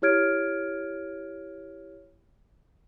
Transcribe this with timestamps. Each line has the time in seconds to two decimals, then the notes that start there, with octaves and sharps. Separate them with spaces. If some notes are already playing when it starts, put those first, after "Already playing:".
0.02 E4 G4 C#5 F6 G#6 D7